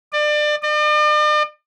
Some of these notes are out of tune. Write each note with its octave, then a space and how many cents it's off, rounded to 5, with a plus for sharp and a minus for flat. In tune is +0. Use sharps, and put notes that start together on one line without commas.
D5 +30
D5 +45